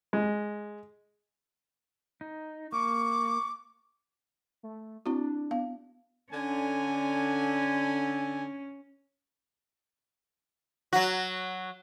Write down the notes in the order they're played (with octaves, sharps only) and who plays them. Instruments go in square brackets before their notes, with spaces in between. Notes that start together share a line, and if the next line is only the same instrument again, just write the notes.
[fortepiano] G#3
[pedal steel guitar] D#4
[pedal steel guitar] A#3 [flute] C#6 [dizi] D6
[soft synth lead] A3
[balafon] C4 E4 F#4 [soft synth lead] D4
[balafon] B3 F5
[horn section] D3 G#5 [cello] C#4
[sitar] F#3 F#4